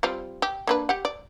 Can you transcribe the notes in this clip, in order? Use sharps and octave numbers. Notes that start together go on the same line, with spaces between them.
G3 C4 F4
G4
A#3 D4 B4
G4 F#5
D5